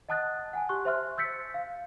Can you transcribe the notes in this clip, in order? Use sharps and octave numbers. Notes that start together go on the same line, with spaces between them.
D#5 F#5 A5 D#6 F#6 A6
F#5 G#5 A5
G4 C6 C#6 F#6
C5 E5 C6 F6 F#6
E6 G6 A6 B6 C#7
F5